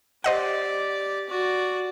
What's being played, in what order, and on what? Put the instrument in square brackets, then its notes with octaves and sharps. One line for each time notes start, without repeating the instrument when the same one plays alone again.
[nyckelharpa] G4 D5 [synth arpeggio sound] C5 D#5 F#5
[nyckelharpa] F#4 D5